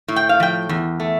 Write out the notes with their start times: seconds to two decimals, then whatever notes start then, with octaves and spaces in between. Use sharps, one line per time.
0.08 A2
0.16 G5
0.29 F5
0.40 F3 G5
0.69 E2
1.00 A3